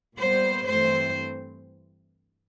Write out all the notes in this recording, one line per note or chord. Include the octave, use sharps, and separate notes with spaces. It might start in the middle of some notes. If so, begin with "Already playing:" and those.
A#2 G3 B3 C5
G2 E3 A3 C4 C5